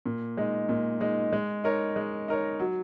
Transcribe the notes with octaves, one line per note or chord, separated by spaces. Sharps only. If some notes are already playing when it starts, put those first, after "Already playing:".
A#2
G#3 D#4
A#2
G#3 D#4
G#3
D#4 A#4 C#5
G#3
D#4 A#4 C#5
F#3